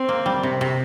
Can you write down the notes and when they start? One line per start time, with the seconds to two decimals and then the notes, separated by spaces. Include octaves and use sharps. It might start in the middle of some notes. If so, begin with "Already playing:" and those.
Already playing: C4
0.09 A#3
0.26 G3
0.43 C3
0.61 C3